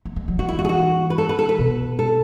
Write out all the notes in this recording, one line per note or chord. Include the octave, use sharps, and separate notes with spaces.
A3
G#3
F#3
E3 F#4
E4
F#4
G#4
F#4
B4
A4
B4
A4
B4
B2
A4